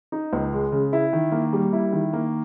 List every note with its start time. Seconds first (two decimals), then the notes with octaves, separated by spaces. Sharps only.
0.12 D#4
0.33 C#2
0.53 G#3
0.72 C#3
0.93 E4
1.13 D#3
1.32 A#3
1.53 G3
1.73 E4
1.93 D#3
2.13 A#3